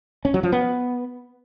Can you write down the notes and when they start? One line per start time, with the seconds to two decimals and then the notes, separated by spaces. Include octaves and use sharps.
0.25 C#4
0.34 F#3
0.43 F3
0.52 B3